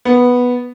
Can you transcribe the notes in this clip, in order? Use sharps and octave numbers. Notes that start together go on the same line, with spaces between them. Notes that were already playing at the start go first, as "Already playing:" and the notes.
B3